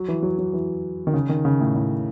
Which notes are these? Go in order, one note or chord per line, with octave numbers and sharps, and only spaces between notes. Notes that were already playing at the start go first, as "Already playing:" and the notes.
Already playing: F#3
E3
F#3
F#3
E3
D#3
C#3
D#3
C#3
A2
A2